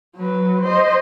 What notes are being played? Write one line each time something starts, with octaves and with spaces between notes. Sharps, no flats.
F#3 B4
C5 D#5